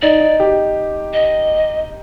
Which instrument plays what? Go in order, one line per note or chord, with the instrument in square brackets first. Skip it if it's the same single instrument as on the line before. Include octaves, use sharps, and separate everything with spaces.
[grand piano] D#4 [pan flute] D5
[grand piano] D#4
G4
[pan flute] D#5